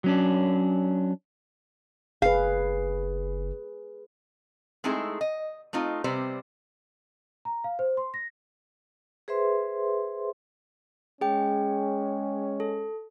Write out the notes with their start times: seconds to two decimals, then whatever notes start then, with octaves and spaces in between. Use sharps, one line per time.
0.04 F#3 C#4 D4
2.22 F#1 G#4 B4 F5
4.84 G#3 A3 C4 D#4 E4 G#4
5.21 D#5
5.73 A3 C4 D#4 F4
6.04 C3 G3 C4 B4 C5
7.45 A#5
7.64 F5
7.79 C5
7.97 C6
8.14 A#6
9.28 G#4 B4 C5 E5 C6
11.21 G#3 C#4 G#4 G5
12.60 A4